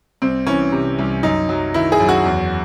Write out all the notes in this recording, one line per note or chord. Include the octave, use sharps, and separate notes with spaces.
C2 C4
E3 C#4
C3
C2
F#2 D#4
F#3
D#3 E4
G#4
F#2
F#4
E2